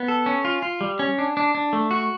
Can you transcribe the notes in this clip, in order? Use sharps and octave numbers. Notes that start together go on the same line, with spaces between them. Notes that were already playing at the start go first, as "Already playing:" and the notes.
Already playing: B3
A4
C#4
F4
F4
G3
C#4
D4
D4
D4
A3
F#4